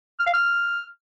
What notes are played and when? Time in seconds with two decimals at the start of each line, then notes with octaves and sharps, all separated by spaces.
0.20 F6
0.27 F5
0.34 F6